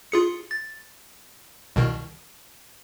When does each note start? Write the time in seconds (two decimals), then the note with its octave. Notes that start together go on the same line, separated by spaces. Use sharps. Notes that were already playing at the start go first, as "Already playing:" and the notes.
0.12 F4 G#4 C#7
0.51 A6
1.76 C2 B2 D#3